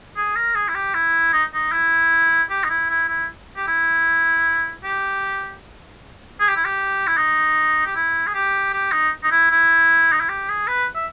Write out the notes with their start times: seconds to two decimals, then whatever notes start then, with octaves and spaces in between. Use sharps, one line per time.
0.17 G#4
0.36 A#4
0.55 G#4
0.68 E4
0.75 G4
0.94 E4
1.33 D#4
1.54 D#4
1.72 E4
2.50 G4
2.64 D#4
2.69 E4
2.90 E4
3.08 E4
3.57 G4
3.67 E4
4.84 G4
6.40 G#4
6.48 G4
6.56 E4
6.65 G4
7.07 E4
7.17 D#4
7.86 G4
7.96 E4
8.27 G#4
8.34 G4
8.73 G4
8.92 D#4
9.24 D#4
9.31 E4
9.51 E4
10.12 D#4
10.20 E4
10.29 G4
10.49 G#4
10.67 B4
10.95 E5